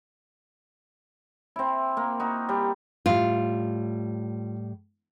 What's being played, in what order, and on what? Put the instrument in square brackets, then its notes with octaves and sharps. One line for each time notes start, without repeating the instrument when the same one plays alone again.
[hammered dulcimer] C4 E4
A#3
D#4 F#4
G3
[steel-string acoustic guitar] A2 G3 [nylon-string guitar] F4